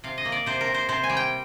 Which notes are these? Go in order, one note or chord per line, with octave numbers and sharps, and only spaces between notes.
C3 F5
D#5
A#3
D5
C3 C5
A#4
C3
C5
C3 C5
G#5
G3
G5